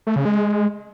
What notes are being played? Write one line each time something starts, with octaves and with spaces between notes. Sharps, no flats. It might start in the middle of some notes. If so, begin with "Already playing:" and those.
A3
C#3
G#3